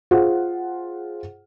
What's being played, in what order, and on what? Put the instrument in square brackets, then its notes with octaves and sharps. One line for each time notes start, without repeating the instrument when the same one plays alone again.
[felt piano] F4 G#4 C5 F#5